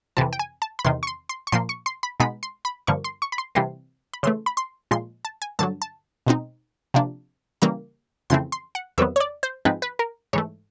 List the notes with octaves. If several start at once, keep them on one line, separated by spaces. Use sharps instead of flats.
F2 C3 E3 A5
G5
G#5
A5
B5
E2 C3 D#3 C6
C#6
C6
C6
C#6
A#2 F3 A#3 C6
C#6
C6
B5
B2 G#3 B3 D#4 B5
C6
B5
G2 D3 F3 A#3 C#6
C6
C#6
B5
C6
C3 E3 G3 A#3 C6
B5
C#3 E3 A3 C6
B5
C6
A#2 F3 G#3 C6
A5
G#5
G2 D3 F#3 A5
A5
B2 G#3 C4 D#4
C3 F3 A#3 D4
C#3 E3 G3 A#3 A#5
F2 C#3 E3 A3 C4 C6
C6
F#5
E2 C3 D#3 F#3 B3 E5
C#5
D5
C5
G#2 F3 G#3 C4 D#4 B4
B4
A#4
G#2 E3 A3 C#5